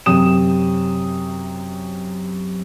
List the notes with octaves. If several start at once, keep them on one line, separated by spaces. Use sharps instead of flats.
F#2 C3 D#6 E7